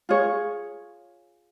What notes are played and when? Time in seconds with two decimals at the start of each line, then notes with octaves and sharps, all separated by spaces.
0.09 F4 G#4 C#5